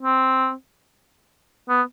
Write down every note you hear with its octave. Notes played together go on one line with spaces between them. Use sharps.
C4
B3